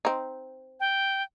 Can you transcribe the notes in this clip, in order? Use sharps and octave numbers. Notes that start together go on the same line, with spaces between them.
C4 D#4
G5